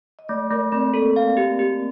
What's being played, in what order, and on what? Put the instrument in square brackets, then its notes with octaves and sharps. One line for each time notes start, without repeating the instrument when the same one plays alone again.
[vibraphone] D#5
[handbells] A3 [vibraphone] D5
[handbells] A3 [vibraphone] A#4
[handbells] A3 [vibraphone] C4
[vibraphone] A#3 [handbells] A4
[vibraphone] A3 [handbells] F5
[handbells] G4
G4